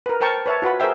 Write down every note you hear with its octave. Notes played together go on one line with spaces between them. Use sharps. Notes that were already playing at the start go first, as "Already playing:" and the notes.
A#4 B4
A#4 C5 G5 A5 C#6
B4 C#5 E5 A5
F4 F#4 B4 B5
G#4 A#4 C5 E5 G5